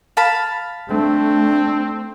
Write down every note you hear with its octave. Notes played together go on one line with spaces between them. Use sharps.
F5 A5 B5
A3 C4 D4